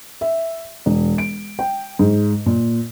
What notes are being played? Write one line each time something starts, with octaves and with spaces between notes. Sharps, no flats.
E5
E1
D7
G5
G#2
A#2